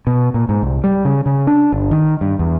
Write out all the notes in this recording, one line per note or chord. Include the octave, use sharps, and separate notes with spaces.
B2
A#2
G#2
C2
G3
C#3
C#3
D4
G1
D#3
G2
E2